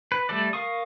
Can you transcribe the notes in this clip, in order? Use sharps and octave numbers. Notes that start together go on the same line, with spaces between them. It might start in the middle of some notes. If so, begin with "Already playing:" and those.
B4
G3 A3 A4 D5
A#4 F5 C#6 D#6